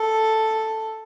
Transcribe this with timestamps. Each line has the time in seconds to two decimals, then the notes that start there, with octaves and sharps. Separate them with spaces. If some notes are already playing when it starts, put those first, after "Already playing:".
Already playing: A4